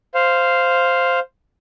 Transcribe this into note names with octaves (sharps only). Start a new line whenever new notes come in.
C5 F5